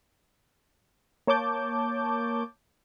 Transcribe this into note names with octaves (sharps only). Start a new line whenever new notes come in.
A#3 C#5 A5 D6 G6